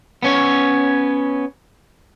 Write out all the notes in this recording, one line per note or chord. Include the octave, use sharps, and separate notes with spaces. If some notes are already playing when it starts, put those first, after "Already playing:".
B3 C#4 C#5